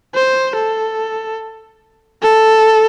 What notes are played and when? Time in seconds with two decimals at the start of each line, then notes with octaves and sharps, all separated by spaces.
0.15 C5
0.56 A4
2.23 A4